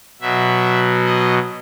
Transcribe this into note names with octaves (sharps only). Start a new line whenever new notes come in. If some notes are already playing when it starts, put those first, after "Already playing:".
B2 F#3 E5
D#5